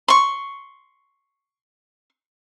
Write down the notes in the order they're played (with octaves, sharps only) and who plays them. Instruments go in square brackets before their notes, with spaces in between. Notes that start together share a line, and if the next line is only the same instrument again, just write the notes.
[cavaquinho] C6 C#6